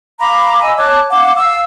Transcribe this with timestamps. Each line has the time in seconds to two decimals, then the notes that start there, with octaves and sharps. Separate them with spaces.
0.20 F5 A#5 B5 D6
0.62 D#5 G#5 E6
0.78 C#5 A5 D6 F#6
1.10 F5 F#5 D6
1.37 F5 E6